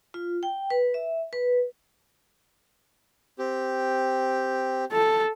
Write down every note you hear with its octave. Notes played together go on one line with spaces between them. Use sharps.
F4
G5
B4
E5
B4
C4 G4
A4